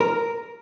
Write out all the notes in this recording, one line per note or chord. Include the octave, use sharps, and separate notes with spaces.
A#4